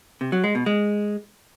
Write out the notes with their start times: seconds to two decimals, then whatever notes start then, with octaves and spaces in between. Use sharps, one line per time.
0.21 C3
0.32 F#3
0.44 G#3
0.55 B2
0.66 G#3